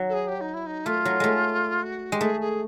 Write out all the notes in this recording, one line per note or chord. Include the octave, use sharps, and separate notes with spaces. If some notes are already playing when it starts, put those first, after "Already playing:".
Already playing: F#3
A4
G#4
G4
D#4
E4
D#4
A3 F4
F#3
G#3 A3
F#4
G#3 G4
A3 G#4
G#4